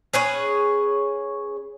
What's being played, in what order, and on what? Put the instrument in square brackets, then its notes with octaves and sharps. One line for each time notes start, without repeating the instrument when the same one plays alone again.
[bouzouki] C#4 G#4 B4 C#5